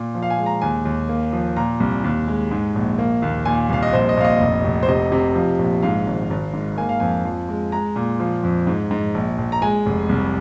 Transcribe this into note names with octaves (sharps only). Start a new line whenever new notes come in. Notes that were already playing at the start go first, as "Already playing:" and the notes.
Already playing: A#2
F3
F5
G#5
G#3
A#5
D#2 G#5
D#2
A#3
F3
A#2 A#5
C2
D#2
G#3
G#2
A#1
A#3
D#2
A#2 G#5
C2 F5
D#5
A#1 C5
D#5
A#1 F5
D#5
F1
F1
C5
C3 D#5
C3
F3
A#1
G#2 F5
G#1
G#1
G#2
A#3 G#5
F5
F2 G#5
F3
G#3
G#3 A#5
A#2
F3
F2
G#2
G#2
A#1
A#1
A#5
G#3 G#5
F1
C2